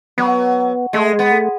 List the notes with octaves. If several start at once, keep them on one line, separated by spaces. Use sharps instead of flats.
F#3 B3
G#3 A3
G#3
B3
A3